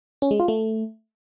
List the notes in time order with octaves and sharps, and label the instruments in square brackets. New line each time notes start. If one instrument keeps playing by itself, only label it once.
[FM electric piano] C#4
G#3
F4
A3